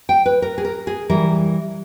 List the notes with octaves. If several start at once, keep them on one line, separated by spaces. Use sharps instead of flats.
G5
B4
A#4
G#4
A#4
G#4
E3 G3 A#4